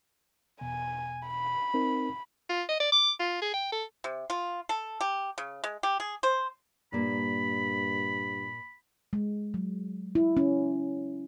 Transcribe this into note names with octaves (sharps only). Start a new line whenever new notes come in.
E2 B2 G#5
B5
C4 D#4 A#4
F4
D#5
D5
D6
F4
G#4
G5
A4
C3
F4
A4
G4
C#3
G#3
G4
G#4
C5
G2 A#2 A#3 B5
G#3
F#3
E4
C#4